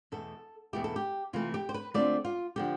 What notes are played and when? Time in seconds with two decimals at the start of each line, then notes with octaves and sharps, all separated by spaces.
0.12 E2 B2 A3 A4
0.73 E2 B2 A3 E4 G4
0.84 A4
0.96 G4
1.33 C3 E3 A3 F4
1.54 G4
1.69 C5
1.74 B4
1.94 D3 A3 C4 F4 D5
2.25 F4
2.56 D3 F3 G4